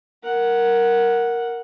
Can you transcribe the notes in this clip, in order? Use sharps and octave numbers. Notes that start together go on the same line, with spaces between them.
A#4 F#5